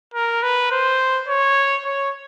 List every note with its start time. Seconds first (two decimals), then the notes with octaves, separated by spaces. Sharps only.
0.14 A#4
0.43 B4
0.71 C5
1.28 C#5
1.86 C#5